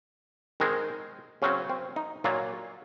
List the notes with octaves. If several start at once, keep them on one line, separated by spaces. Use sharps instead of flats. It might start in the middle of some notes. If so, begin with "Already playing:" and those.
D#3 G#3 C4 A#4
C#3 F#3 C4 C#4
C4
D#4
A#2 F#3 A#3 F4